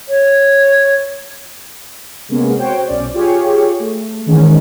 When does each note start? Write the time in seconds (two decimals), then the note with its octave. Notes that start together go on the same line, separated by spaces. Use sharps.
0.09 C#5
2.28 C3 G#3 A#3 B3 C#4 G#4
2.58 F#4 C5 C#5 G5
2.87 B1 C#4 D5
3.14 F4 G4 G#4 C#5
3.80 A3
4.26 D#3 E3 G#3 C#4 D#4